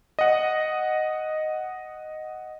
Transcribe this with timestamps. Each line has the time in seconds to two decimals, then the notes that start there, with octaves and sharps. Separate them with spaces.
0.19 D#5 F#5